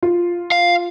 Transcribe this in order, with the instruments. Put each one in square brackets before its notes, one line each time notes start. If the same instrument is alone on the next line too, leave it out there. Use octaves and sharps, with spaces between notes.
[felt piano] F4
[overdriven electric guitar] F5